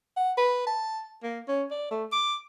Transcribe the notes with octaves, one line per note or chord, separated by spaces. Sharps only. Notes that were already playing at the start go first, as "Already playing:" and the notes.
F#5
B4
A5
A#3
C#4
D5
A3
D6